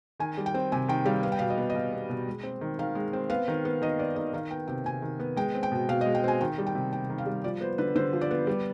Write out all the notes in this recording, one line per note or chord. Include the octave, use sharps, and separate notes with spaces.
D#3 G#5
G3
G5
C4
C3 G#5
D#3 G5
G3 F5
B3 F5
G5
B2 F5
D#5
B3
D#5
B2 F5
B3
B2
G#3
C4
D#3
D#3 F5
G#3
C4
B3 F5
D#3
B3
D#3 D#5
B3 D5
D#3 D#5
D#3 F5
B3 G5
C3 G5
C3 G#5
D#3
B3
G#3 G5
C4
G5
B2
B2 F5
D#5
G#3
G5
C4 G#5
D#3 G5
G3
G5
C3
C3 G5
D#3
F5
G3
F3 D5
B3 C5
D3 B4
D3 C5
F3
D5
B3
G3